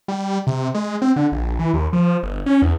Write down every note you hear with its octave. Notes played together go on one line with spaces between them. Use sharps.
G3
C3
G#3
C4
D3
A#1
E3
D#2
F3
G1
C#4
E2